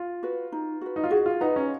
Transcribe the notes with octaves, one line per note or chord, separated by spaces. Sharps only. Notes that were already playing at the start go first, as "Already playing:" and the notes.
Already playing: F4
F#4 B4
D#4
F#4 B4
D#4
F4
F#4 G#4
F4
D#4 B4 F#5 A#5
C#4